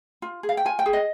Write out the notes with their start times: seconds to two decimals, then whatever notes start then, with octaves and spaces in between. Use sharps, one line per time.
0.22 F4
0.43 G#4
0.49 F5
0.57 G5
0.65 F4 G#5
0.79 G5
0.86 G#4
0.93 D#5